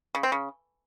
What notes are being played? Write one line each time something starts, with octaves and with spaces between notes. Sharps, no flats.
C#3
C4
C#3